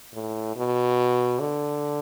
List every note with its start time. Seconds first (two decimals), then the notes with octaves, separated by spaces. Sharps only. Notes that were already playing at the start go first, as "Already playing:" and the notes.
0.14 A2
0.56 B2
1.40 D3